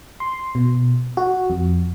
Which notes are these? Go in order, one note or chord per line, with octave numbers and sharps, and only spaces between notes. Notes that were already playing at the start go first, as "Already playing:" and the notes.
C6
B2
F#4
F2